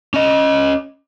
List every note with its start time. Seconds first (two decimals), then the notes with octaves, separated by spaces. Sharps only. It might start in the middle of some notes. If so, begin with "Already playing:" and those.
0.14 C#4 D#5